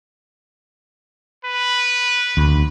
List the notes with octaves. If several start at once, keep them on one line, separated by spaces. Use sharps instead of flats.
B4
D2